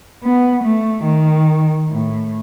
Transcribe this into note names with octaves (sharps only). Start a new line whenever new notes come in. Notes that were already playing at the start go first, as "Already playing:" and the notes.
B3
A3
D#3
A2